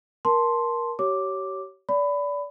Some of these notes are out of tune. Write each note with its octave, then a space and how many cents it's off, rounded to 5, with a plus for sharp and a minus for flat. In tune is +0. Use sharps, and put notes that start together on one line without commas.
A#4 +20 A5 +0 C6 +0
G4 -35 C#5 +0 D6 +0
D5 -25 B5 +15